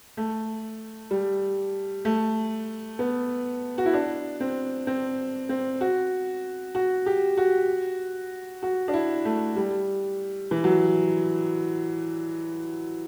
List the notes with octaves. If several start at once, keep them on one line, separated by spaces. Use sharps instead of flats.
A3
G3
A3
B3
F#4
E4
D4
C4
C4
C4
F#4
F#4
G4
F#4
F#4
D4
E4
A3
G3
E3
F#3